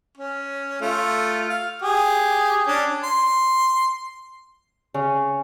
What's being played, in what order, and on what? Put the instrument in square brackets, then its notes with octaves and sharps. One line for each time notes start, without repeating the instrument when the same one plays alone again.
[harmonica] C#4
A3 F4
F5
G4 G#4
C#4 D4
C6
[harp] C#3